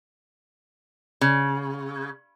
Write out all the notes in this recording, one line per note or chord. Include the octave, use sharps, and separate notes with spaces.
C#3